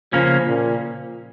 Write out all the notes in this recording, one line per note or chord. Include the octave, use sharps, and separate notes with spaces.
C#3 F3 A#3 C#4
A#2